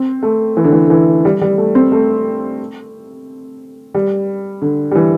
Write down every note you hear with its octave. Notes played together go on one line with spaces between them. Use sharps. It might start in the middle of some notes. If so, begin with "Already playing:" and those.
Already playing: C4
A3
E3
D3
E3
D3
E3
G3
G3
A3
C4
A3
G3
D3
G3
E3